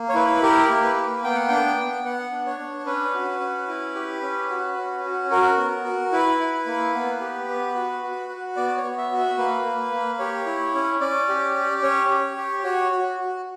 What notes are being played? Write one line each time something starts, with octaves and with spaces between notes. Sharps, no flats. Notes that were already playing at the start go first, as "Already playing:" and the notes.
Already playing: A#3
C#5
E4 B4
G4 A#4
A#3
B4
A#3
B3 G5
F#5
D4 G5
B3
B3 F#5
D4
C#5
D4
C#4 B4
F#4
C#4
E4
G4
C#4
F#4
C#4
F#4
F#4 A#4
B3
F#4
E4 B4
E4
A#3
B3
G4
B3
F#4
F#4
F#4
B3 D5
C#5
B3
E5
F#4
E5
A#3 B4
A#3
A#3
G4 C#5
E4
C#4
C#4 D5
G4
G4
C#4 C#5
G4
G4
F#4 C#5
F#4
F#4